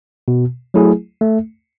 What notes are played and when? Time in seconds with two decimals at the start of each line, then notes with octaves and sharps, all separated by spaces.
0.28 B2
0.74 F#3 A3 E4 G#4
1.21 A3